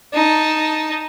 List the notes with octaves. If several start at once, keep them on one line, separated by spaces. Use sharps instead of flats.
D#4 A5